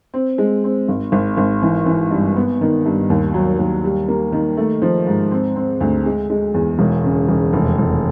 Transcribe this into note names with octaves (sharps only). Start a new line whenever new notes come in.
C4
G#3
C4
G#1
G#1
G#1
E3
E3
G2
B3
D#3
G2
D#2
F#3
D#2
G3
A#3
D#3
A3
F3
G#2
C4
C4
D2
G#3
G#3
E2
E1
C#3
E1
F1
F1